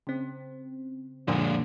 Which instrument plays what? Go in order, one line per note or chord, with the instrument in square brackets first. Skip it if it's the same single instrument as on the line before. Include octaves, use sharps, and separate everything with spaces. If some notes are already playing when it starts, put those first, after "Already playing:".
[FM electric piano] C#3 C4
[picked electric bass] F#1 A#2 D3 [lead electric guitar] F3 G#3